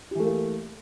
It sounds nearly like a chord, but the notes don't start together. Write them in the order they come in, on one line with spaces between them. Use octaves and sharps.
G4 E3 A3 A#3